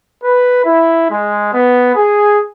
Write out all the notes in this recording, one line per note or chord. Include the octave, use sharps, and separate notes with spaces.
B4
E4
G#3
B3
G#4